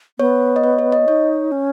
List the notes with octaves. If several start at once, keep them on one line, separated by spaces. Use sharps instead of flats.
B3 C#5
D#5
C#5
C#5
D#5
D#4 C#5
C#4